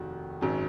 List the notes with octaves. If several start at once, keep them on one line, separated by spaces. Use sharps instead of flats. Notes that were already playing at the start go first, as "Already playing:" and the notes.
Already playing: F1 D#2 D#3 F#4
G#1 F#2 D#3 F#3